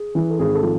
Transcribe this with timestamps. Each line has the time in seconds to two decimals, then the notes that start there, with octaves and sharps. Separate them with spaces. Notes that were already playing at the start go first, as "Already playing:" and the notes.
Already playing: G#4
0.15 E3
0.30 A4
0.39 G#1 G#4
0.54 A4
0.63 F3